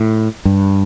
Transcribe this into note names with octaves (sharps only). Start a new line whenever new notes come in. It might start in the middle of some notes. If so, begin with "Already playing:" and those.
Already playing: A2
G2